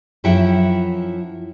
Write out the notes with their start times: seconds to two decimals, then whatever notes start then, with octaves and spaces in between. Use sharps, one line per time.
0.24 F#2 F3 E4 E5 F#5 G5